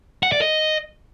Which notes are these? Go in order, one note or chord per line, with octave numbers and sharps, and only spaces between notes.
F#5
D5
D#5